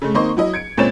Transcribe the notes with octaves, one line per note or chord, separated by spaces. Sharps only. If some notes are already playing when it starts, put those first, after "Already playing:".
C#3 G#3 A3
D#3 A#3 C4 D#5 C6 C#6
F#3 E4 D#5
G#6 C#7 D7
C#2 A#2 C4 C#5 A6 E7